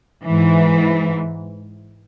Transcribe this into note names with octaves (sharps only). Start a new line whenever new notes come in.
G#2 E3